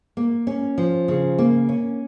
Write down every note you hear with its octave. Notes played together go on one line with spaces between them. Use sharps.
A#3
C#4
F3
C#3
A#3
C#4